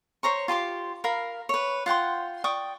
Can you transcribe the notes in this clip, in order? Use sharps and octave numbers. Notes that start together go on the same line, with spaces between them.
C5 C#5 A#5 C#6
F4 G4 C6 D6
A#4 F5 B5
B4 C#5
F4 F#5 G5 C6
D5 G5 C#6 D#6